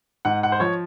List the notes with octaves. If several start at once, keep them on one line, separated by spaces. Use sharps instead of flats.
G#2 F#5
F#5
C5
F3 C#5